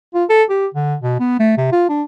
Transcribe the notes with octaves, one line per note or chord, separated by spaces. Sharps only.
F4
A4
G4
D3
B2
B3
A3
C3
F4
D4